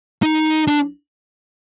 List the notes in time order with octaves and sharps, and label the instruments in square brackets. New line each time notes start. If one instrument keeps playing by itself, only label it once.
[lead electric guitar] D#4
D4